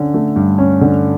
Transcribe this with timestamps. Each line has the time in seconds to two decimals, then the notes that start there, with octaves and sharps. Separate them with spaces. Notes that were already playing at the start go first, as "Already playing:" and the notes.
Already playing: D3 C#4
0.14 A3
0.36 G2
0.58 C#4
0.81 D3